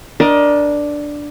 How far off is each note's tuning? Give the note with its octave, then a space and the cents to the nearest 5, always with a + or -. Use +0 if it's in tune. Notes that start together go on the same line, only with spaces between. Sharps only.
D4 +0 A#4 +25 D#5 +0